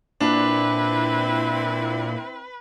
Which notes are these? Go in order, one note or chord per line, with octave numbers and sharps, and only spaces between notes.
A#2 C4 D4 E4 B4